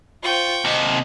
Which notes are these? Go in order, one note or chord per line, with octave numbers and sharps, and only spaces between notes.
F4 C5 G5 C#6
D#2 C3 D#5